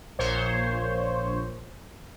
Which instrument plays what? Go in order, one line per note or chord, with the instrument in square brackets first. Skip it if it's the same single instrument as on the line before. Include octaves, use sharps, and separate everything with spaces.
[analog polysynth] A#1 A#2 C5 C#5